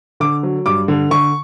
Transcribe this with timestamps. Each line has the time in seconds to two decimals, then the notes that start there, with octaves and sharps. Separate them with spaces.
0.20 D3 D6
0.43 F#3
0.66 G2 D6
0.88 D3
1.11 D3 C#6